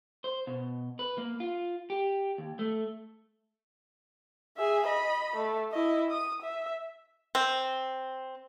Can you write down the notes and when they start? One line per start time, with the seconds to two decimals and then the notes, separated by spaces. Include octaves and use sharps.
0.24 C5
0.47 B2
0.99 B4
1.18 A#3
1.40 F4
1.90 G4
2.38 D#2
2.59 A3
4.57 G#4 E5
4.86 D#5 B5
5.36 A3
5.72 E4 D#5
6.10 D#6
6.42 E5
7.35 C4